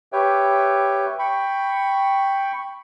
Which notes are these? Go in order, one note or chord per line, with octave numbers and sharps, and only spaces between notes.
G4 B4 C#5 E5 G5
G5 B5 C#6